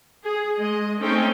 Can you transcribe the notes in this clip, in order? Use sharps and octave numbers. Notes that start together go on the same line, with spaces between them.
G#4
G#3 D#5
A3 C4 C#4 D#4 G5